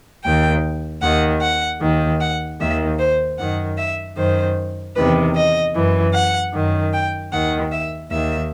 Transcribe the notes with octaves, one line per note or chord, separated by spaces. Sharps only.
D#2 D#3 G5
D#2 D#3 F#5
F#5
D#2 D#3
F#5
D#2 D#3 E5
C5
F#2 D#3 F#5
E5
F#2 D#3 C5
E2 C3 D#3 B4
D#5
F#2 E3
F#5
F#2 D#3
G5
D#2 D#3 F#5
E5
D#2 D#3 E5